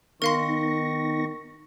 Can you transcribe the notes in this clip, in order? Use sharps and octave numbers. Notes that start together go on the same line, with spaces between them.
D#3 B3 D#4 A#4 F5 C6 C#6 A#6